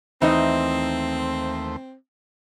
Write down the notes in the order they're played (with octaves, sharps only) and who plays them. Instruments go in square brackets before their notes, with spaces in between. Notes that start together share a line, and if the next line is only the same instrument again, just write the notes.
[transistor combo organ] D#2 A3 C5 [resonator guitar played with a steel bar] E3 D#4 D#5 [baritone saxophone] C4